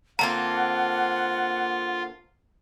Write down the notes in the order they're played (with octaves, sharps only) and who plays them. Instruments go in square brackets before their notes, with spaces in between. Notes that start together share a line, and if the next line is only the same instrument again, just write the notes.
[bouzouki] D3 A#3 C4 [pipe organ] F4 [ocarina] F#5 [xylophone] A#5